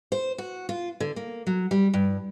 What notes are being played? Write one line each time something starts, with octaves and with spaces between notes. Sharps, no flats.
C5
F#4
F4
D3
A#3
F#3
G3
G2